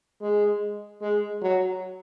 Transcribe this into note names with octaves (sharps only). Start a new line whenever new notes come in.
G#3
G#3
F#3